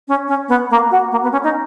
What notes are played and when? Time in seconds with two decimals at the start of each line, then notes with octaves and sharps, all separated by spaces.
0.08 C#4
0.28 C#4
0.49 B3
0.70 A#3
0.91 F#4
1.11 A#3
1.23 B3
1.32 C#4
1.44 D#4